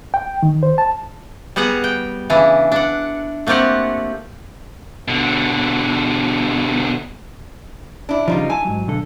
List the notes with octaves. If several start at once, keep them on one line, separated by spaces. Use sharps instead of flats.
G5
D#3
C5
A5
G3 B3 G#4 F#5 A#5
G5
C#3 E3 D4 E4
D4 F#5
A3 A#3 C4 F4 G4 F#5
B2 D3
D4 E4
C#3 F3 G3 D#4 F4
E4 G#5 A5
G#2 F#3
B1 D3 A4